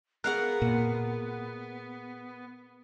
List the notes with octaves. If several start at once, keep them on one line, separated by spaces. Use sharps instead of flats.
B3 G#4 A#4 F5 F#5 F#6
A#2